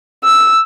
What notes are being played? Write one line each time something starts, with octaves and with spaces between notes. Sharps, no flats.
E6